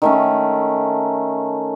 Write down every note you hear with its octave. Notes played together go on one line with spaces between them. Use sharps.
D#3 A3 C#4